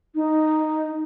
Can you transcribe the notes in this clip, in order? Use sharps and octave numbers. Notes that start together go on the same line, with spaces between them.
D#4